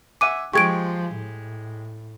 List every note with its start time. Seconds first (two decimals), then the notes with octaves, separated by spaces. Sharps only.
0.21 E5 F#5 G#5 D6 D#7
0.53 F3 G#3 G4 C#6 G#6 D7
1.15 A2